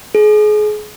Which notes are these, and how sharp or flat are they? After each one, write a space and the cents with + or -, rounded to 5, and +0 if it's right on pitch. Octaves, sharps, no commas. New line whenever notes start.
G#4 +30